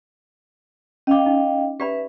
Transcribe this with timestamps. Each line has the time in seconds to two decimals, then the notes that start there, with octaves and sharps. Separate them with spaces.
1.07 C#4 D#5 F5 G5 D6
1.26 D#4
1.80 G4 B4 D5 E5 B5